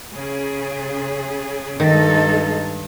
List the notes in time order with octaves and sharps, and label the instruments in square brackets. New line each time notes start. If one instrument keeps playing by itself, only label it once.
[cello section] C#3 G#4
[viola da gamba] G2 [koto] D#3 [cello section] G#3 D#4 A4